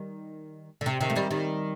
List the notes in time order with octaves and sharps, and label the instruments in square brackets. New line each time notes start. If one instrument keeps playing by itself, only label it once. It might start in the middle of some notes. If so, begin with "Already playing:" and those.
Already playing: [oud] D#3 G3
D3
C3
C3 D#3
A3
D#3 G3
D#3 G3